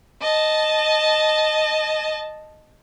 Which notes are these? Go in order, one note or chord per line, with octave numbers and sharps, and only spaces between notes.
D#5 A5